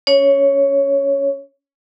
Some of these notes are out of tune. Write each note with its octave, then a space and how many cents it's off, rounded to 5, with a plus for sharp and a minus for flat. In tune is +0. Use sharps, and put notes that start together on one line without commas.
C#4 +20 C#5 +0